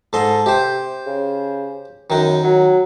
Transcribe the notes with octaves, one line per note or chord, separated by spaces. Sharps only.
G#2 A4 D#5 C6
C3 G4 C5
C#3
F#2 D#3 D#4
F#3